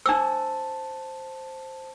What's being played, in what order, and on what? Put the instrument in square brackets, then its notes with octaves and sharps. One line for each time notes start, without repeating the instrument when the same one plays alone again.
[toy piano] D4 D6 E6 [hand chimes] C5 A5